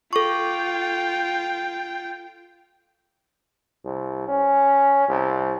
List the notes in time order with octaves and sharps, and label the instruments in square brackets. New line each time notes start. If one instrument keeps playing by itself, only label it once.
[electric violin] F4 G5 [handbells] A4 C#6
[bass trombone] C2
C#4
C2